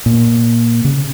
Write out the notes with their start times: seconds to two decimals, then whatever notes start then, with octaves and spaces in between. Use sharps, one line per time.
0.06 A#2
0.85 C#3